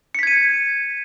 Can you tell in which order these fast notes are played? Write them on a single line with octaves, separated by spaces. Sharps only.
C#7 B6 G#6 D#7